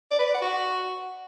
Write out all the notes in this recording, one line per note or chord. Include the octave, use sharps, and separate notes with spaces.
D5
B4
D5
F#5
F#4